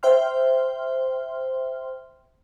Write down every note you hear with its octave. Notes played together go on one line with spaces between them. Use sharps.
C5 E5 G5 C6 F6